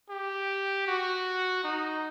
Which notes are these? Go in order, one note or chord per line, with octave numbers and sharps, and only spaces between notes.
G4
F#4
D#4